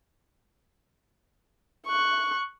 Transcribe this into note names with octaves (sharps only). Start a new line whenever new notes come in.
C#6 F#6